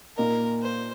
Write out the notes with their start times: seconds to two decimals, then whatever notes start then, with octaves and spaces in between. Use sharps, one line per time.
0.17 A#2 A#3 D#4 A#4
0.62 C5